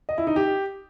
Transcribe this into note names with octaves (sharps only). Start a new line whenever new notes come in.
D#5
E4
D#4
G4